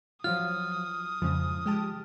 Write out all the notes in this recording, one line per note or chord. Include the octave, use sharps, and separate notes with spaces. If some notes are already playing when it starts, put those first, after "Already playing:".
F3 F#3 F4 F5 D#6 F6
F2 G#2 C#3 F3
G#3 G4 A5